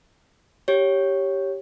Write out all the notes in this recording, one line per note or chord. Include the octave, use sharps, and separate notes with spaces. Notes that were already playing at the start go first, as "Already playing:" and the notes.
G4 C#5